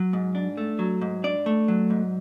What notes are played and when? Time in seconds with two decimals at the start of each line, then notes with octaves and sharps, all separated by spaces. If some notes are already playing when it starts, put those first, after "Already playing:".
Already playing: F#3
0.13 G#2
0.35 D4
0.57 A3
0.79 F#3
1.01 G#2
1.24 D4 D5
1.46 A3
1.68 F#3
1.90 G#2